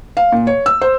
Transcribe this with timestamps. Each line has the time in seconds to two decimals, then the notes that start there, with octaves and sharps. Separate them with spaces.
0.17 F5
0.32 A#2
0.47 C#5
0.66 E6
0.81 C5